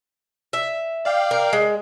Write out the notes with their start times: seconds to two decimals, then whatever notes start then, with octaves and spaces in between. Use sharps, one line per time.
0.53 E5
1.05 D5 F5 G5
1.31 A#4
1.53 G#3